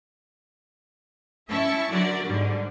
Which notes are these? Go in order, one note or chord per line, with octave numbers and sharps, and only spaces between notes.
C#4 E4 E5 A5 C#6
D3 F#3 F#4 A#4 D5
G#2 D3 G3